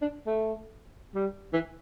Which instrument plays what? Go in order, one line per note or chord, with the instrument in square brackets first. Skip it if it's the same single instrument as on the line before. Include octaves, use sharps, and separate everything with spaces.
[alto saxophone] D4
A3
G3
E3